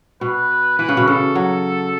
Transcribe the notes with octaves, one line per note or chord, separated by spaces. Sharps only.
B2 B4
E3 B4
C#3
B2
C#3 A4
F#3